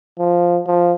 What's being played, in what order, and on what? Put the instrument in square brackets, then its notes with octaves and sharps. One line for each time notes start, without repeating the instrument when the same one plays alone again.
[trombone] F3
F3